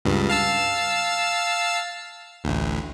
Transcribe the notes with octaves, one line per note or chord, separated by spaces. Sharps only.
C#2 G2
F5 A5 E6
A1 D2